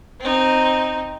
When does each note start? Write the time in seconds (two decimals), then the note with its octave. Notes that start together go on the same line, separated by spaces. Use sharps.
0.21 C4 D#4